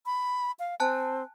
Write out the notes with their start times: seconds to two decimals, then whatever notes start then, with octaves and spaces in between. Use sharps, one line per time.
0.06 B5
0.59 F5
0.80 C4 G#5 A5 F#6